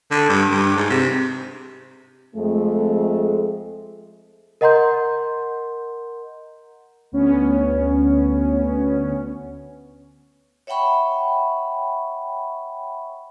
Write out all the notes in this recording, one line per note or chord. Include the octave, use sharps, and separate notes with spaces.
D3
G2
G2
G#2
C3
F2 G#3 A3
A#4 D#5 F#5 A#5 C6 G6
D2 B3 C#4
C#5 E5 F#5 G5 B5 C#6